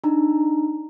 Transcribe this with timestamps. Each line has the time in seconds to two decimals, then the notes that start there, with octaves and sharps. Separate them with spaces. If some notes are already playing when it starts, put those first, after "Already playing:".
0.04 D4 D#4 A#5